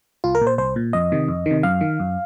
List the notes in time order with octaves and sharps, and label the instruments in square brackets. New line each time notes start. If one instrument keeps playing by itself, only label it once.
[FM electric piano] C2 F4
A#4
A#2
C5
C2 C5
A#2
F2 D#5
C3 D#3
F2
C3 D#3
F#2 F5
D#3
F#2